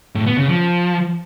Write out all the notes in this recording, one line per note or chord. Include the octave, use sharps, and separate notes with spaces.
A2
B3
C#3
F3